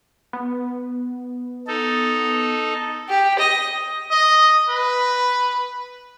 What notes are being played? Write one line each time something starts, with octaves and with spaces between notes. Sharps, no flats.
B3
D#4 A4
G4
D#5
D#5
B4